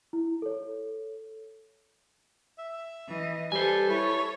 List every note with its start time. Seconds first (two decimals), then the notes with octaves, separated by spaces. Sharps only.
0.13 E4
0.42 A4 C#5
2.58 E5
3.08 E3 D#5
3.52 G3 A4 B4 C5 G#5
3.90 E4 C#5